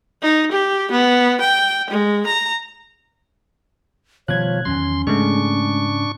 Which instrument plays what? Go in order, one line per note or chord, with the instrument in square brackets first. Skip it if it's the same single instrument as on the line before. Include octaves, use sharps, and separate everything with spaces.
[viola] D#4
G4
B3
G5
G#3
A#5
[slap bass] B2 D#3 G3 [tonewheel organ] F3 [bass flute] C#5 [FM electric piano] F#6 G#6
[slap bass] E2 D#3 F#3 [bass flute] C#4 [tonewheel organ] C6
[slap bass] G#2 C#3 [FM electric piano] G#3 A3 [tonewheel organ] D4 C#6